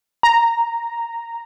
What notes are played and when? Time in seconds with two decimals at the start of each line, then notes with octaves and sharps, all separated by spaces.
0.23 A#5